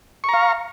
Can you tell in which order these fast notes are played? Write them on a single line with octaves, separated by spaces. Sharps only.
C#6 A#5 F5